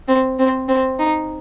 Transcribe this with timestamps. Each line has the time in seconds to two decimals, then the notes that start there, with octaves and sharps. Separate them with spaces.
0.08 C4
0.39 C4
0.68 C4
0.99 D#4